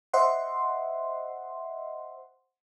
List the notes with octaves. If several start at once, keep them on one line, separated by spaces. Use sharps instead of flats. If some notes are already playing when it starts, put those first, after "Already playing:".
C5 D#5 E5 F#5 C6